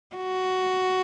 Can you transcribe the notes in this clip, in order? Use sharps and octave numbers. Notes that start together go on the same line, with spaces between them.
F#4